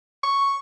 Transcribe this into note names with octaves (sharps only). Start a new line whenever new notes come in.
C#6